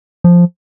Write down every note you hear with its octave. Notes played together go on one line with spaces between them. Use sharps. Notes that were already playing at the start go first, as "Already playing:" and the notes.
F3